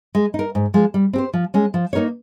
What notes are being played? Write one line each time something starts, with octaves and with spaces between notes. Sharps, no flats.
G#3
D#4 A#4
G#2
F3 G#3
G3
C4 G4 C5
F3
G#3 C#4
F3
A#3 D#4 A#4 C#5